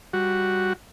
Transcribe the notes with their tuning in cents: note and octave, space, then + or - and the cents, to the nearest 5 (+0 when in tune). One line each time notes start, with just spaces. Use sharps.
G3 +0 F#4 +0